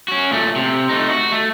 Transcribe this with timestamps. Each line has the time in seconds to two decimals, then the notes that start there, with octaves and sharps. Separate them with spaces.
0.08 C#4 F#4
0.31 A#2 A3
0.56 C3
0.89 A3 D#4
1.10 F#4
1.32 A3